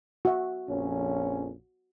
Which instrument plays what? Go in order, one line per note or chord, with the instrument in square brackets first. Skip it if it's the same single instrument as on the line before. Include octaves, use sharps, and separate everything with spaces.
[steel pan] F#4 E5
[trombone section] A#1 F2 C#4